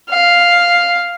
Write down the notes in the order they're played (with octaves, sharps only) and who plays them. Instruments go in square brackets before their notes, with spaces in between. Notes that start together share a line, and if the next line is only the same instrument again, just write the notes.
[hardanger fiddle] F5